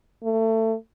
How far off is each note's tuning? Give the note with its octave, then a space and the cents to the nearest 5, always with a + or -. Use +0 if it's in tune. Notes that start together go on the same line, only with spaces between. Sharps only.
A3 +25